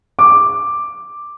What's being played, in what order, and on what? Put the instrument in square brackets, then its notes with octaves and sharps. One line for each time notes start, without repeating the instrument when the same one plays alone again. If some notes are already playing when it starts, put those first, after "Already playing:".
[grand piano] D6